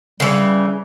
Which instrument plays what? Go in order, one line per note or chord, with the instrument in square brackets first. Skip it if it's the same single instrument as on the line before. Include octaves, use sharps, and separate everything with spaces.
[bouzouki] C#3 E3 [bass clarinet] G3